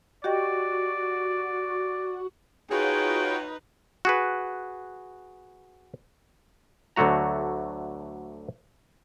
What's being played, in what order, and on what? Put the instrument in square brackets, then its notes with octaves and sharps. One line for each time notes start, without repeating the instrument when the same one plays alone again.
[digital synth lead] F#4 [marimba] G4 D#5 G5 [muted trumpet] D5
[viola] D#4 B4 [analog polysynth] F4 F#4 C#5 [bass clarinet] G#4 [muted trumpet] G5
[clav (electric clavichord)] F#4 G#4 B4
D2 D3 F#3 A3 F#4 A#5